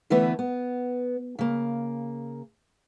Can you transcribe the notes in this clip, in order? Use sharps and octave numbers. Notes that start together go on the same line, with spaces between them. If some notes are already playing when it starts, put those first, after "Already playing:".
D3 E3 A3 B3 E4 B4
B3
C#3 A#3